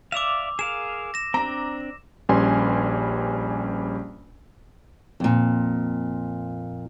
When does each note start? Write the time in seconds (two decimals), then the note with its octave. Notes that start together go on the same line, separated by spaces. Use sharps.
0.12 D5 E5 F5 D6 E6 F7
0.59 G#4 A#4 F5 E7
1.14 A#6 E7
1.34 C4 D4 A#5
2.29 A#1 G3 C#4 B4 G#5 C6
5.20 F2 A#2